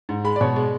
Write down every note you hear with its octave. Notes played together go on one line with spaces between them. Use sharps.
G#2
G#3 B5
D5
B2 C#5
G#3